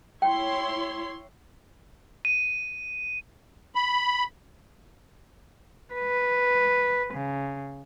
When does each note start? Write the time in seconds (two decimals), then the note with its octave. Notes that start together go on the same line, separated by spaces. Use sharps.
0.22 E4 C#5 G5 C6
2.25 D#7
3.75 B5
5.94 B4
7.14 C#3